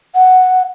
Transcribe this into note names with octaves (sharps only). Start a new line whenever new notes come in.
F#5